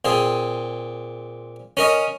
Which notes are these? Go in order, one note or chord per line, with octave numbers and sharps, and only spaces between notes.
A#2 C4 G#4
C#4 A#4 D#5